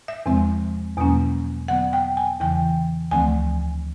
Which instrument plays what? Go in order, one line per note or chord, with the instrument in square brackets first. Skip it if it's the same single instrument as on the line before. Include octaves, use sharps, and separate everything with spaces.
[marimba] E5
E2 C3 F3 G#3 C4
E2 B2 F#3 A#3 C#4
D3 F#3 B3 F#5
G5
G#5
E2 C#3 E3 G5
D2 D3 F3 A3 C4 G#5